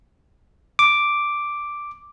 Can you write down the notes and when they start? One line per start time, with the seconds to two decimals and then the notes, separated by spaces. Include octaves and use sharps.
0.79 D6